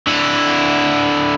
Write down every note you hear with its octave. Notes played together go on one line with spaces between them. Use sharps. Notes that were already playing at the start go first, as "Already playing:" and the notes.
D3 E4